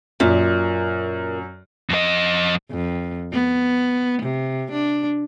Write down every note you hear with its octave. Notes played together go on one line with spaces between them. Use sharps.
F#2 A#2
F2 D#5
F2
B3
C3
D4